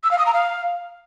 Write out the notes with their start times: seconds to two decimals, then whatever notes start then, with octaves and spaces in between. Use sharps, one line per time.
0.04 E6
0.11 F5
0.19 D#6
0.26 A#5
0.34 F5